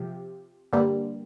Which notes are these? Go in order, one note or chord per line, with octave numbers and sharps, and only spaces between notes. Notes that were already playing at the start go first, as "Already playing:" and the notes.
Already playing: C3 F3 G4
G2 D3 G3 A#3